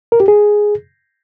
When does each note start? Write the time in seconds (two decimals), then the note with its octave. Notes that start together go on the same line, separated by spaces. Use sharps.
0.12 A#4
0.20 G4
0.28 G#4